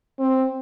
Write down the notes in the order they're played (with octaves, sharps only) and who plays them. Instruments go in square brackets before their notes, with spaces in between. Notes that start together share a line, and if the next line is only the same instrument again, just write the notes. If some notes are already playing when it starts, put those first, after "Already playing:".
[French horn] C4